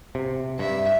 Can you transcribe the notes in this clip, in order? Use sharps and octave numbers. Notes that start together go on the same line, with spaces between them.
C3
G2 E5